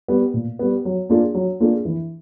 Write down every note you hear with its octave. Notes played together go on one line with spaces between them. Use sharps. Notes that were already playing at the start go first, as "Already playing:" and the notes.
G3 B3
A#2
G3 B3
F#3
A#3 D4 F4 G#4
F#3
A#3 D4 F4 G#4
E3